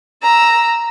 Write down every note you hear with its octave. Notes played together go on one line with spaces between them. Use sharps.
A#5 E6